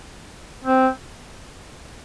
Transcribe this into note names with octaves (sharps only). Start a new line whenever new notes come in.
C4